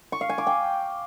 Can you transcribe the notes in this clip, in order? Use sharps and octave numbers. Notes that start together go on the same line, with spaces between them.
C#6
F5
G#5
D6
G5